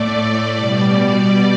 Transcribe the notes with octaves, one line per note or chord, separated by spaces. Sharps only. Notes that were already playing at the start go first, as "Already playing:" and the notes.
Already playing: A2 A3 D5
B2 G3 D5
D5
D5